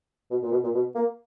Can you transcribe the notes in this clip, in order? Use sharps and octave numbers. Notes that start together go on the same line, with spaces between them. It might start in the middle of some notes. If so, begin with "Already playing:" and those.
B2
A#2
B2
A#2
B2
A#3